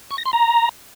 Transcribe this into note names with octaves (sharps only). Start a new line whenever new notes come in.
C#6
A#6
C6
A#5